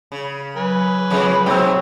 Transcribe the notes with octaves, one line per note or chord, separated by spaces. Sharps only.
C#3
F#3 B4 G#5
F2 C#3 G#3
G#2 B2 C4 C#5 G5